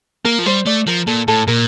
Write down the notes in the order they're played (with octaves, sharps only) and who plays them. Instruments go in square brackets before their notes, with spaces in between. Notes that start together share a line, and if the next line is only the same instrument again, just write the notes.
[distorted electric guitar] A#3 [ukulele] A#4
[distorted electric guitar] F3
[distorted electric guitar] G3 [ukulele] C5
[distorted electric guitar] A3 [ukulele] D5
[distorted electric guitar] F3 [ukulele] A#4
[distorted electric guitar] A#2 [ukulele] A4
[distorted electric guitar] A2 [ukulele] A4
[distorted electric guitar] A#2 [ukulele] A#4